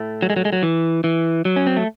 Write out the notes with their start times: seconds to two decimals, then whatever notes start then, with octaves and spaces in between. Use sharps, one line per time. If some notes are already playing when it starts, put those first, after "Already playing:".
Already playing: A2 A3
0.22 F#3
0.30 G#3
0.36 F#3
0.45 G#3
0.53 F#3
0.63 E3
1.04 E3
1.45 F#3
1.56 C#4
1.66 C4
1.77 A3